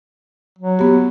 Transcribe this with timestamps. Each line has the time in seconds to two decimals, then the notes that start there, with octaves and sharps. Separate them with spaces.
0.58 F#3
0.79 B3 G4